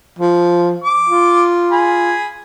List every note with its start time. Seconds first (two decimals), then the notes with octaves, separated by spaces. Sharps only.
0.19 F3
0.84 D6
1.09 F4
1.71 G#4 B5